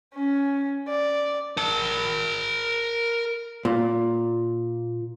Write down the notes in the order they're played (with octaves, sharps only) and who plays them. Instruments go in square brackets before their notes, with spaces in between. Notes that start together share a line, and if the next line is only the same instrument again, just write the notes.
[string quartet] C#4
D5
[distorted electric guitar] A#4 A5
[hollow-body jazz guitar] A#2